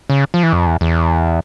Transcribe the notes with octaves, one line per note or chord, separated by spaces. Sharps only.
C#3
F3
E3
F2
E2
E2